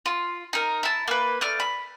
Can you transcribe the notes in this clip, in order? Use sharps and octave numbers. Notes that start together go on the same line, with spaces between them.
F4
D#4 A#4
E4 A5
A#3 B4
A3 D5 F6
B5